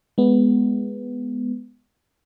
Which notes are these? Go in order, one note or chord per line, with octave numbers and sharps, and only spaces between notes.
G#3 B3